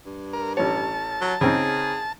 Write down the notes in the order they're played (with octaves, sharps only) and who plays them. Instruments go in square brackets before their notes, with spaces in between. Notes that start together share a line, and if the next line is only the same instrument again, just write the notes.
[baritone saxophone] G2
[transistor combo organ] A#4
[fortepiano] A1 C#5 [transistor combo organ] A5
[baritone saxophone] F#3
[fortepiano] C#3 C4 D#4 [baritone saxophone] G#4